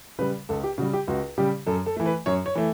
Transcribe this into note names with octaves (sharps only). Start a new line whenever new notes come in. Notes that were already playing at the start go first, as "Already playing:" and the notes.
C#3 G3 B4
C#2 A4
G4
C#3 G3 F#4
G4
C#2 F#4
C#3 G3 G4
F#2 A4
A4
E3 A3
B4
F#2 C#5
C#5
E3 A3